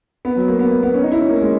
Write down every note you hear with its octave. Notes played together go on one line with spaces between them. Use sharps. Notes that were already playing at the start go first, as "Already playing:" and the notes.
B3
F#3
A#3
B3
A#3
B3
C#4
D#4
E4
C#4
A#3
G#3